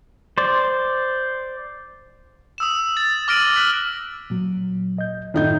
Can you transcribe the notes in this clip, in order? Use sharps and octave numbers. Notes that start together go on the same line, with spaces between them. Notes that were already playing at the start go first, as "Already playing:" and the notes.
C5 D5
D#6 E6 E7
A6
D6 F6 A#6 D7 D#7 F#7
F#6 B6 F#7
A#2 F#3
D#5 G6
F#2 A2 D#3 D#4 G6